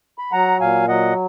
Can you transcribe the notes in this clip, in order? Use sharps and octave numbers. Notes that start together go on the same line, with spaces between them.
B5
F#3 F#5 A#5
A#2 F5 G#5
F#3 D#5 F#5